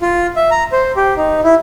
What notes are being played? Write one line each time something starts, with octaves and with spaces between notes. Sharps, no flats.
F4
E5
A#5
C5
G4
D#4
E4